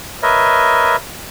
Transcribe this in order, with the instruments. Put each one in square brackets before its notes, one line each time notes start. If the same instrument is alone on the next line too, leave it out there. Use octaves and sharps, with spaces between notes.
[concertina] A#4 B4 C#5 D#5 E5